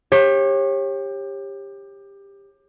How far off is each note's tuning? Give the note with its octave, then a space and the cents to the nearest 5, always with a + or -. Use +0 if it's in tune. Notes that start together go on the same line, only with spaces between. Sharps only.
G4 +20 C#5 -30